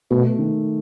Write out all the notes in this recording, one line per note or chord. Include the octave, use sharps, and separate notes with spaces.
B2 A3
D#3